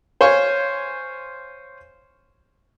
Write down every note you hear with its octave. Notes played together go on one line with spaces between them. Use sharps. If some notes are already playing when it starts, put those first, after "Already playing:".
C5 C#5 F5 G#5 C#6